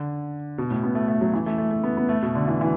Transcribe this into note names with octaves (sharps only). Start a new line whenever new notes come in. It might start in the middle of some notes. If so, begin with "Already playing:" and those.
Already playing: D3
B2
A2
B3
A3
A3
F#3
E3
A3
A3
A3
B3
B3
A3
B2
D3
E3
E3